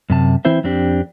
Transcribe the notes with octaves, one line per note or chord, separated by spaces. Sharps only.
F#2 C3 A5
E3 C4 E4 C5 E5
F2 C4 D4 G4